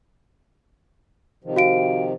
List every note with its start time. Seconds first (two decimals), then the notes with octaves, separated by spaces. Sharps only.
1.44 C3 D#3 F3
1.56 F#4 F5 D7